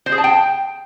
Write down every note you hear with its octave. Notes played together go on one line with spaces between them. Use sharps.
C5
G#4
A5
G5